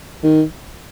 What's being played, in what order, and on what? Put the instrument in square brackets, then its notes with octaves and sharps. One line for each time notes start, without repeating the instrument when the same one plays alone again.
[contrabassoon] D#3